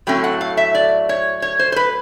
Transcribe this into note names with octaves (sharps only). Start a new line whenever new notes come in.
A2 F#3 A3 C4 G5
F#5
F5
E5
D5
C#5
C#5
C5
C5
B4